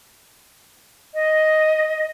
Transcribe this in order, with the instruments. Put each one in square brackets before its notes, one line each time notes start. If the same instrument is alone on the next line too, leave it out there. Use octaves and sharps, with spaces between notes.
[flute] D#5